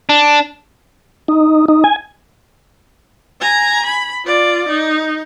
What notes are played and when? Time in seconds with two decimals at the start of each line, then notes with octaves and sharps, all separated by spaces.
0.09 D4
1.28 D#4
1.68 D#4
1.84 G#5
3.41 G#5 A#5
3.86 B5
4.25 F4 D5
4.69 D#4